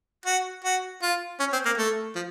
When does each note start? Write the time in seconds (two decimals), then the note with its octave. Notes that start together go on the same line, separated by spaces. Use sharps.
0.26 F#4
0.65 F#4
1.02 F4
1.40 C#4
1.53 C4
1.66 A#3
1.78 A3
2.16 F3